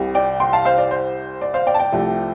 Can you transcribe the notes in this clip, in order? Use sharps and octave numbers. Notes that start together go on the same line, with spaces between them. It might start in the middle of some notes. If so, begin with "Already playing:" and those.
Already playing: C2 C3 G3
D5 G5
G5 C6
F5 A5
C5 F5
D5
C5
D5
C5 F5
D5 G5
A5
D5 G5
C2 C3 F3 A3